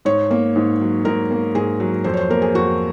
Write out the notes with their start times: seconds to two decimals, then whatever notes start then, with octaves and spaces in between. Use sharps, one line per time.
0.05 G#2 C#5
0.31 A#3
0.56 G#2
0.81 F#3
1.05 G#2 A#4
1.31 A#3
1.55 G#2 G#4
1.80 F#3
2.04 F2 C5
2.14 C#5
2.17 C5
2.29 A#3 A#4
2.42 G#4
2.54 F2 F#4